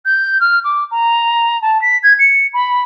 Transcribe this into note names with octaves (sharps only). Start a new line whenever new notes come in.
G6
F6
D6
A#5
A5
B6
G#6
C#7
B5